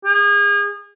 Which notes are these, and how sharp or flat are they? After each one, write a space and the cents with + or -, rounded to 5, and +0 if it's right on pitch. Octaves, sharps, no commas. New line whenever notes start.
G#4 -35